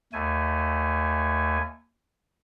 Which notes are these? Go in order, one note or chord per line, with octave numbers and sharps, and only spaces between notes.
D#2 A3 G#5